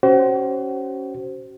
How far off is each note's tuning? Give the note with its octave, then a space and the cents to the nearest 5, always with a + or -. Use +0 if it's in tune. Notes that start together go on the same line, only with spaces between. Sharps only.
C#4 +0 F#4 +40 C5 +0